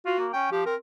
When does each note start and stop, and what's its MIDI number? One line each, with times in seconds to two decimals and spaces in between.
0.06 0.15 65
0.06 0.28 66
0.19 0.30 58
0.33 0.47 61
0.33 0.49 79
0.52 0.64 53
0.52 0.65 67
0.66 0.75 60
0.66 0.76 70